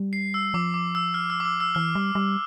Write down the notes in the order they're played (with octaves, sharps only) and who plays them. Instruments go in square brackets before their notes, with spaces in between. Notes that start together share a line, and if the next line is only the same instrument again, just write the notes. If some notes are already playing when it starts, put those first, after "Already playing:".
Already playing: [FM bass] G3
[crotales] C7
E6
[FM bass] F3 [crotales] D6
[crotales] D6
E6
F6
E6
D6
E6
E6
[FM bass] E3 [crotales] F6
[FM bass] G3
G3